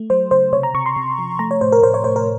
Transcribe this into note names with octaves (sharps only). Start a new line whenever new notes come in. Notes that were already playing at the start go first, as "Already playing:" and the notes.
Already playing: A3
F#3 C5
C#3 C5
C3 C#5
A#5
C3 C#6
C6
C3
F3
A3 A#5
C#5
A2 C5
A#4
A2 C5
C#5
A2 C5
A#4